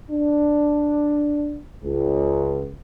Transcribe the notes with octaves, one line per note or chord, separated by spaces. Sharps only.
D4
C#2